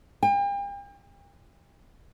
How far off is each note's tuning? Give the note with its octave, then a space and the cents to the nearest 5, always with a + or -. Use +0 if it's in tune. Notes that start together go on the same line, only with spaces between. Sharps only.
G5 +40